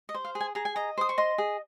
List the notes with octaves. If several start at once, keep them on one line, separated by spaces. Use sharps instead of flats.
D#5
C5
F5
G#4
G#5
G#4 A#5
G#5
D#5 A#5
C5 D#6
C#6
D#5 C6
G#4